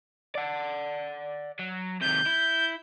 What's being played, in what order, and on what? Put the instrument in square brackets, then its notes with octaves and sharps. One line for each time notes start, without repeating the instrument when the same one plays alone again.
[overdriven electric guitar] D5 F#5
F#3
[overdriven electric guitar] C3 D#3 [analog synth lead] G6
[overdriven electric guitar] E4